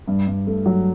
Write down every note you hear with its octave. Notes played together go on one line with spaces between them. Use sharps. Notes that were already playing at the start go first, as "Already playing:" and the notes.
G2
G2
A3
F#3